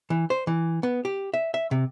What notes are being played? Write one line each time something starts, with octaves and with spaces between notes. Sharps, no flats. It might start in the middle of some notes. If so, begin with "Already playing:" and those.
E3
C5
E3
B3
G4
E5
E5
C3